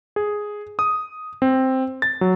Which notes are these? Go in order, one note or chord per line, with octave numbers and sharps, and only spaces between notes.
G#4
D#6
C4
A6
F#3